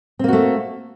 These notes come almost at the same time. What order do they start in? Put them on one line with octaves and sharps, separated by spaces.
C4 A#3 F#4 A3